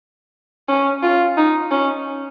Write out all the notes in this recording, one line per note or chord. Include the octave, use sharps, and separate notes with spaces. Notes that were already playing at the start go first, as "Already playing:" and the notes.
C#4
F4
D#4
C#4